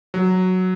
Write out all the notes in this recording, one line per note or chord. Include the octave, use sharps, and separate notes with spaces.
F#3